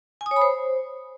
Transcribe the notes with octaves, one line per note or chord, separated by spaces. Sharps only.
G#5
D#6
C#5
B5
C5